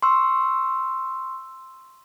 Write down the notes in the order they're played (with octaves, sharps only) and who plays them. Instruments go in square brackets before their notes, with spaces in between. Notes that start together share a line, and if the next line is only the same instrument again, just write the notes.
[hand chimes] C6 C#6 E6